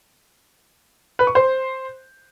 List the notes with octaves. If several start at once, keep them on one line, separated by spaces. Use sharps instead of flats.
B4
C#6
C5